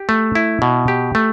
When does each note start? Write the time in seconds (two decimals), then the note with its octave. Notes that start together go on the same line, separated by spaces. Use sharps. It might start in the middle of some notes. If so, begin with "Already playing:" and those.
Already playing: G4
0.09 A3
0.35 E4
0.62 B2
0.88 G4
1.15 A3